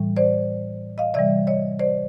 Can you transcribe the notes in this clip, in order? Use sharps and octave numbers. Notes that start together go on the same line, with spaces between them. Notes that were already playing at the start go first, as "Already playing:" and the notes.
Already playing: A2 E3 G3
C5 D5
D#5 F5
C3 E3 G3 D5 E5
C#5 D#5
C5 D5